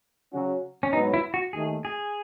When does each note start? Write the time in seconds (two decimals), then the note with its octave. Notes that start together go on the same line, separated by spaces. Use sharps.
0.33 C#3 F#3 C#4 F#4
0.83 C#4
0.93 G#2 F#3 B3 D#4
1.14 E4
1.34 F#4
1.53 D#2 D#3 A3 G#4
1.85 G#4